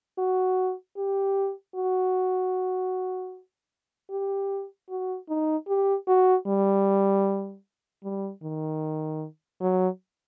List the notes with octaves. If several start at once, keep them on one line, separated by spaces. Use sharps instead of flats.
F#4
G4
F#4
G4
F#4
D#4
G4
F#4
G3
G3
D#3
F#3